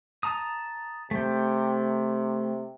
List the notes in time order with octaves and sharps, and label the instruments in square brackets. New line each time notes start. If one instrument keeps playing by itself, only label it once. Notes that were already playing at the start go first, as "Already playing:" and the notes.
[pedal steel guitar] A5 A#5 D#6
[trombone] C3 [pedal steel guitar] A3 G5